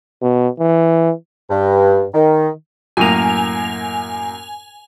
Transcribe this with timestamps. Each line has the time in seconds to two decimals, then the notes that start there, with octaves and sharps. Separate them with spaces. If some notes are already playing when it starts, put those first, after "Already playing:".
0.22 B2
0.59 E3
1.50 G2
2.14 D#3
2.97 F#2 A2 A#3 G#5 F7